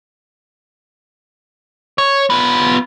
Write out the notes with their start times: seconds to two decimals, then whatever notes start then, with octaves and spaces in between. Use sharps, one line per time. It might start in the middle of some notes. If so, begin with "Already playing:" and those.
1.98 C#5
2.30 B3 F4